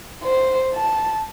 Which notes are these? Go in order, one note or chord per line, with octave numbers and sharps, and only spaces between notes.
C5
A5